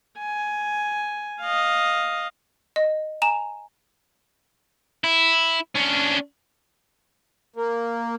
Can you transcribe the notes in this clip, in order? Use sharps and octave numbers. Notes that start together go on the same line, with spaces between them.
G#5
D#5 F5
D#5
G#5 A#5 E7
E4
C#4 D4
A#3